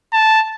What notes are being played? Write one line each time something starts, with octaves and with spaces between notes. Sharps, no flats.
A5